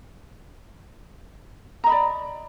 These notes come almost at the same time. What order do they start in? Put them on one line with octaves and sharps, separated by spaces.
A#5 D#5 B5 D5